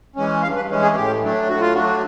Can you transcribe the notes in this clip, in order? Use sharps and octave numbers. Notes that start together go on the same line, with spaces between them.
E3 G#3 C#4
G2 F5
B4
E3 G#3 C#4
G#4
A2 G4
F#3 A3 D4
A2 F#4
F4
F#3 A3 D4 F#4